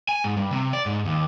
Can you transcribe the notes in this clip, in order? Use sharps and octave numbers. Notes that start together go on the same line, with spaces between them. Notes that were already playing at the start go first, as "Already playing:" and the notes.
G#5
G#2
G2
C3
D5
G#2
D#2